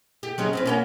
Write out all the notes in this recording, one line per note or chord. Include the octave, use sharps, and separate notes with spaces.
G4
F#3 G#3 C#4
C4 C#4 B4
A#3 C#4 F#4